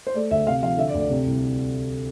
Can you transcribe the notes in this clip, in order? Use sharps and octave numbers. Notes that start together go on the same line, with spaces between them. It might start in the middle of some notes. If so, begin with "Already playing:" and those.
C5
A3 D5
D2 E5
C3 F5
F3 F5
D3 E5
D5
D2
D5
C3
C2